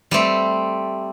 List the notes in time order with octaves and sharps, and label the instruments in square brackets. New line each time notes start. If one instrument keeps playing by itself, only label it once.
[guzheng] G3 A3 C4